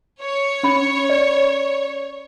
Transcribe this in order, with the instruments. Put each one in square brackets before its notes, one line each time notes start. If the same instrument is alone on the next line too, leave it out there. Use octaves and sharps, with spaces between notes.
[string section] C#5
[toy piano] C#4 B5
D5